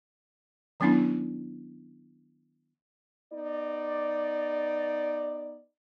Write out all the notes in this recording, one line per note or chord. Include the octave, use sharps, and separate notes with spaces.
D#3 F#3 B3 C#4 D4 E4
B3 D#4 D5